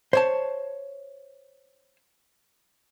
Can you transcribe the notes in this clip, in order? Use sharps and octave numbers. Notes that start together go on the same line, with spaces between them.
C5 C#5 A5